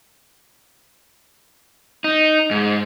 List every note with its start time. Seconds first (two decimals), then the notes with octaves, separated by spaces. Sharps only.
2.04 D#4
2.51 G#2